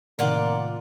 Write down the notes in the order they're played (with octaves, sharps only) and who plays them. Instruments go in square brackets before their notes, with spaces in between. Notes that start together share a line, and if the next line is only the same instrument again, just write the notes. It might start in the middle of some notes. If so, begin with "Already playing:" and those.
[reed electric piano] A2 C3 D#3 [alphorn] A#3 [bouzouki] F4 D5 F#5